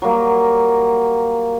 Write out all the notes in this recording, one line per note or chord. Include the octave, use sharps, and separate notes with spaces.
F#3 G3 A#3